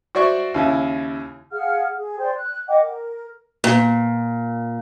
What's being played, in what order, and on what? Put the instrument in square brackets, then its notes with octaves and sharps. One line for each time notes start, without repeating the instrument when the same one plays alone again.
[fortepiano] F#4 C5 D5 E5 C#6
D#2 C#3 E4
[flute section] G#4 F5 F#5 F6
G#4
C5 D5 G5 C6
F#6
D#5 F#5 G5 D6
A#4
[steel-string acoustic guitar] A#2